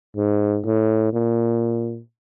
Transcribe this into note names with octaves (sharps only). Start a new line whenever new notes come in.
G#2
A2
A#2